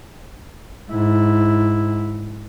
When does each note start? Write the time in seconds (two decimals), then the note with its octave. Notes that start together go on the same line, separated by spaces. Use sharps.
0.91 G#2 E4